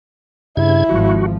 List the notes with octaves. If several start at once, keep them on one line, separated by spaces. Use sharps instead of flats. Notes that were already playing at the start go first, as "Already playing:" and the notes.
G2 C#3 E4 G#6
G#1 F3 F#4